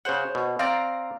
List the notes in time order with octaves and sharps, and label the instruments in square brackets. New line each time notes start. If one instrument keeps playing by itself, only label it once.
[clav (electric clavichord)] C#3 F#5 [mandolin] C5 C#5
[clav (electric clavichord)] B2
[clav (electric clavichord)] C4 D5 [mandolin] F5 A#5